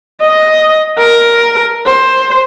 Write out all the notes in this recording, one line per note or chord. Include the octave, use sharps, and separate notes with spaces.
D#5
A#4
C5